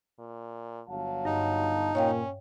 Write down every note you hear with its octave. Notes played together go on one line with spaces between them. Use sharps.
A#2
G1 F#3 F5 A5
G2 D#4
A#2 C#4 C#5 F5 G5